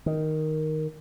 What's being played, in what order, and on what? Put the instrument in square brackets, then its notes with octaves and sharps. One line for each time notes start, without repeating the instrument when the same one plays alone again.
[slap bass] D#3